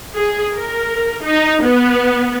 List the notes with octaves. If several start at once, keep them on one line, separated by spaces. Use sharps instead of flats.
G#4
A#4
D#4
B3